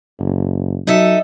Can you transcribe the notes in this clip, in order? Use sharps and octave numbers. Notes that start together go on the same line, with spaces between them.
F#1
F#3 D#4 A4 E5